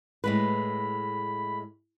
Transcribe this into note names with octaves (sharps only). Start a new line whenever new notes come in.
A2 G#3 B4 B5